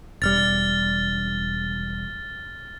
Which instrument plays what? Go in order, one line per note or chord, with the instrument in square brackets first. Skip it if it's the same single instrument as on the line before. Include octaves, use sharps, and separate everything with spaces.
[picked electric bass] E1 G3 [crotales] F6 A6